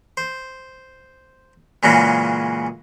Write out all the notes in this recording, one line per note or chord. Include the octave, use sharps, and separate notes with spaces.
C5
A#2 C#3 E3 F#3 G#3